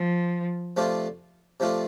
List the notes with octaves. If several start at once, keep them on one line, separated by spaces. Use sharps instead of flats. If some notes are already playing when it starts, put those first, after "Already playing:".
Already playing: F3
C3 F3 A3 D4 F4
C3 F3 A3 D4 F4